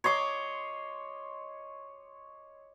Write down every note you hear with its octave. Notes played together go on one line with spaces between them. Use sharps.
C#5 D#5 C6 D6